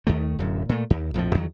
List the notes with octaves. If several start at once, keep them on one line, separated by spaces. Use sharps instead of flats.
D#2 D#3 A3
D1 F#2
A#2 A3
D#2
A#1 F2 A2 F3
E2 D#3 F#3